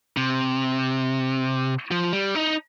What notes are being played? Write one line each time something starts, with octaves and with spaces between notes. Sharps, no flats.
C3
F3
G3
D#4